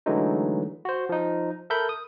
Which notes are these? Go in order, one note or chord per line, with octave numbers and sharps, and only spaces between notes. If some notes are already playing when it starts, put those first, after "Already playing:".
D3 E3 F#3 G#3 A3 D#4
F#4 C5
F3 D#4
A4 A#4 E5 B5 G6
D#6